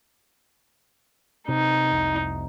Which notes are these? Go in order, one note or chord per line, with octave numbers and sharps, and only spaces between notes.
C3 D#4
F1 C2